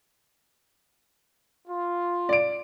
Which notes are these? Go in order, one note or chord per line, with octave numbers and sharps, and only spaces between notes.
F4
D5 D7